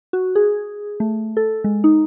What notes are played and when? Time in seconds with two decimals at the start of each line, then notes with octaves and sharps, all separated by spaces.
0.13 F#4
0.36 G#4
1.00 A3
1.37 A4
1.64 G#3
1.84 D#4